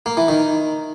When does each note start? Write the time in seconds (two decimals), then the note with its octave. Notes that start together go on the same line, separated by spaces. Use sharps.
0.06 A#3
0.17 E3
0.28 D#3